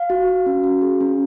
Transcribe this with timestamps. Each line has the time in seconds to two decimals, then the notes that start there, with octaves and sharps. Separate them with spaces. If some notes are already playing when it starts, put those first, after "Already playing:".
Already playing: F5
0.10 F#4
0.28 F#4
0.46 C#4
0.64 F#4
0.82 G#4
1.01 C#4